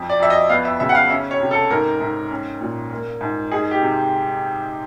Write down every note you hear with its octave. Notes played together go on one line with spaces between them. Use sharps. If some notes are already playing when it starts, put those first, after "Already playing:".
Already playing: F2
D5
F2 E5
D#5
B3 F5
E5
C#3 E5
F#5
F5
C#4 E5
C#5
C3
A4
G#2 A#4
G#2
C#4
A#2
A#3
G#2
D#4 G#4
G4
C3